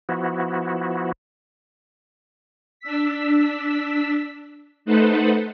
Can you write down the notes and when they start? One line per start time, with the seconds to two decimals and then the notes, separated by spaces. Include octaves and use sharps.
0.09 F3 B3 E4 F#4
2.80 D4 E6 B6
4.85 A3 D#4 A4 B4 C5 F#5